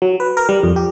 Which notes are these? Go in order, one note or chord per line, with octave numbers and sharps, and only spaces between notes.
F#3
B4
A#4
G3
F2
G4